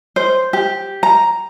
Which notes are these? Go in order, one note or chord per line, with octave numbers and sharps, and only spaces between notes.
C5
G4
A#5